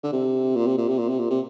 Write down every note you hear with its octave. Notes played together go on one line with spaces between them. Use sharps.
D3
C3
A#2
C3
A#2
C3
A#2
C3
A#2
C3